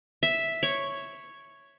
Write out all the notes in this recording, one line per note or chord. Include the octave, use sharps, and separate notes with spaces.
E5
C#5